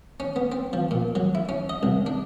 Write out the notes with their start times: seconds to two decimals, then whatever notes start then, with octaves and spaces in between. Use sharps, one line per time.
0.20 C#4
0.36 B3
0.52 C4
0.73 F3
0.91 A#2
1.15 F#3
1.35 E4
1.49 C#4
1.69 D#5
1.83 C2
2.06 D4